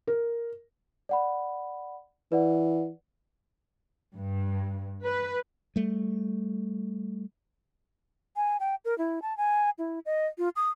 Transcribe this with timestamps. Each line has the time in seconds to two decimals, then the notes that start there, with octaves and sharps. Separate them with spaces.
0.07 A#4
1.09 D5 F#5 B5
2.32 E3 B4 D5 F#5
4.17 G2
5.05 B4
5.76 G3 A3
8.36 G#5
8.60 G5
8.85 A#4
8.98 E4
9.22 A5
9.37 G#5
9.78 E4
10.05 D#5
10.38 F4
10.56 D#6